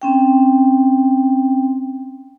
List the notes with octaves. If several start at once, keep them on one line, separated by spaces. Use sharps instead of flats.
C4 C#4 G5